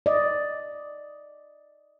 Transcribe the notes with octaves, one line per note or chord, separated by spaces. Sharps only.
D5 D#5